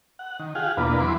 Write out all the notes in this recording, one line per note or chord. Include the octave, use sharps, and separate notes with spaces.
F#5
D#3
F4 G4 G#4 F5 F#5
E2 B2 A#3 D4 F4 B4
E2 E3 F#3 B5 C6 D6